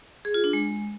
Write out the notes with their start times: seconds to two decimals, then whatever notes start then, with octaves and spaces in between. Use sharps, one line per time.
0.25 G#4
0.34 F4
0.44 D4
0.53 G#3